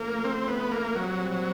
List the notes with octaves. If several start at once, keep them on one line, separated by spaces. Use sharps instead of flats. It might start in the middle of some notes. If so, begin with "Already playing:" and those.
Already playing: C#3 F3 A3 A#3
C4
B3
A#3
A#2 F#3 G3 C4
F#3